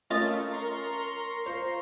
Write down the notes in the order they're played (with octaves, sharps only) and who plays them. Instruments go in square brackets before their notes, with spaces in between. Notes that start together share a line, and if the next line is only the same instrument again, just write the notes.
[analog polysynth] A3 [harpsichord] C#4 [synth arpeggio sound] F4 D#5 A6 [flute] A#4
[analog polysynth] A#5 C6 C#6
[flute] F4 [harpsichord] C5